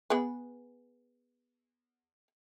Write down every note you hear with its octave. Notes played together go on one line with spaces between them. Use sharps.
B3 G#4 B4